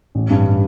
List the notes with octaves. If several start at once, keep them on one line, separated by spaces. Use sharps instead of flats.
A1
G2